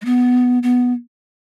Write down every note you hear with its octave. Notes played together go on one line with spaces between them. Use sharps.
G#3
B3
B3